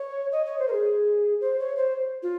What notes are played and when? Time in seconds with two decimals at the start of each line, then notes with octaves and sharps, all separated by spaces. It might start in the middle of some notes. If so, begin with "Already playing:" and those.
Already playing: C#5
0.32 D#5
0.46 C#5
0.59 C5
0.68 A#4
0.72 G#4
1.41 C5
1.59 C#5
1.77 C5
2.22 F4